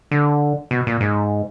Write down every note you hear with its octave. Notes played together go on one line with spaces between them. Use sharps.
D3
B2
A#2
G#2